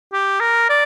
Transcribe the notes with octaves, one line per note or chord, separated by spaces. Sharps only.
G4
A#4
D5